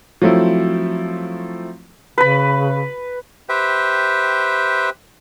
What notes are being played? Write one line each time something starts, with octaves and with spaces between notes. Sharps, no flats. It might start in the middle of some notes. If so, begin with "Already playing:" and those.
F3 F#3 A3 C4 E4
C#3 B4 B5
G4 B4 C5 E5 G5